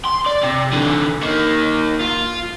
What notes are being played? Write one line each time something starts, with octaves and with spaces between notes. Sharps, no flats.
C6
D5
C3
D3 E3
A#3 D#4
F4